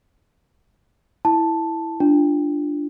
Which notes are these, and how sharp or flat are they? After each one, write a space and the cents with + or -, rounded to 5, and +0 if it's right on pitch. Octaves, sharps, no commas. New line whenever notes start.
E4 -5 A5 +0
D4 +0 F4 -20